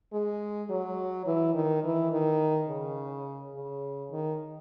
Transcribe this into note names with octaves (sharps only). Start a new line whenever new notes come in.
G#3
F#3
E3
D#3
E3
D#3
C#3
C#3
D#3